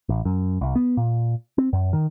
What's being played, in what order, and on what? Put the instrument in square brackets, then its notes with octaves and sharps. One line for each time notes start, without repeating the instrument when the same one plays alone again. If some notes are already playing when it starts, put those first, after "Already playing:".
[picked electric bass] A1
F#2
C2
B3
A#2
C4
F#2
D#3